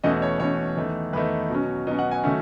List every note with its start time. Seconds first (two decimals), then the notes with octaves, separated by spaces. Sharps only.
0.03 E2 B2 A3 C#4 D#5
0.22 C#5
0.40 E2 B2 A3 C#4 C#5
0.77 E2 D#3 A3
1.13 E2 D#3 A3 B4
1.50 B2 F#3 C#4
1.87 B2 F#3 C#4 D#5
1.99 F#5
2.11 G#5
2.23 D#3 F#3 A3 C#4